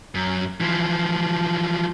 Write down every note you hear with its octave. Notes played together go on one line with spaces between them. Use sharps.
F#2
E3 F3